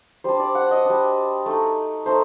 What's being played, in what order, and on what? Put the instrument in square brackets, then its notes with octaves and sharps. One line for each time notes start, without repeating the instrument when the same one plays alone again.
[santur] G3 D4 C5
D5
F#5
D#5
G3 D4
A3 D#4
A3 D#4 C5